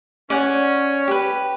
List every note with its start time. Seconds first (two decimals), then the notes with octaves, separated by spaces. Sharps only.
0.30 C#4 D5 F#5 G#5
1.08 G4 B4